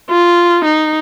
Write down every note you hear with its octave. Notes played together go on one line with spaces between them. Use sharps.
F4
D#4